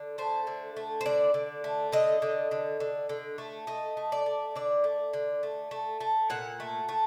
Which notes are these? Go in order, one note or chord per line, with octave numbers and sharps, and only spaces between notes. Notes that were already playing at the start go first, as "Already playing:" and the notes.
Already playing: D3
A3 C5
D3
A3
C5
D3 D5
D3
A3
D3 D#5
D3
D3
D3
D3
A3
A3 D#5
A3
D5
A3
D3 D5
A3
D3
A3
A3
A3
A#2 F#5
A3
A3